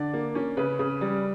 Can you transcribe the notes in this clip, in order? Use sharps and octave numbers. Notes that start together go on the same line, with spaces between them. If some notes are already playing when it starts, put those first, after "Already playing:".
Already playing: D3 D5
A#3
C#4
C#3 B4
C#3
G3